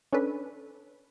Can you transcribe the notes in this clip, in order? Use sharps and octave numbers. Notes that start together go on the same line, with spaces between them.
C#4 D4 A4 B4